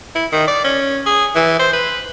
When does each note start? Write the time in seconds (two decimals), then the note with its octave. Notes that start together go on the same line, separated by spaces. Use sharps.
0.15 E4
0.33 D#3
0.47 D5
0.64 C#4
1.06 G#4
1.35 E3
1.59 C5
1.73 B4